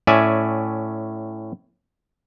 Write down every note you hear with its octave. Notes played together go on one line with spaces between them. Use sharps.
A2 C#4 D5 E5 G#5